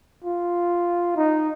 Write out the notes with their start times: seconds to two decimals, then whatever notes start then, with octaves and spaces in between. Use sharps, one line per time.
0.24 F4
1.17 D#4